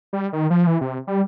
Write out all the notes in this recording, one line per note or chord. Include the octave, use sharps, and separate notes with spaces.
G3
D#3
F3
E3
C3
G3